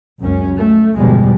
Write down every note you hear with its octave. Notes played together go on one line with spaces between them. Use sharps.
C#2 F#2 C#4
A3
G1 E2 B2 F3 G3 G#3